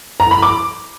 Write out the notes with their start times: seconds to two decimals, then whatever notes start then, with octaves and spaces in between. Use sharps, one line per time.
0.20 A#5
0.31 B5
0.42 D6